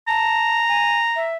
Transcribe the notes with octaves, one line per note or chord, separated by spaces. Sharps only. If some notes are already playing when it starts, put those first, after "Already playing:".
A5 A#5
G#5
E5